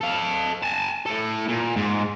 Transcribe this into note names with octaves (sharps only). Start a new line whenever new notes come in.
A4 F5
G#5 A5
A2 A4
A#2
G#2